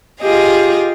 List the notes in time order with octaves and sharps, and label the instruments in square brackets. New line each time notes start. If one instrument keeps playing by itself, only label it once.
[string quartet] F4 G4 G#4 D#5